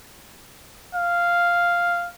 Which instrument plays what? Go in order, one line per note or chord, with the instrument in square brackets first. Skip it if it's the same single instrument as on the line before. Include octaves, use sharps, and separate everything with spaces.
[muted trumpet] F5